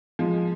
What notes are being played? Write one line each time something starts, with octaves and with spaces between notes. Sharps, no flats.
F3 G#3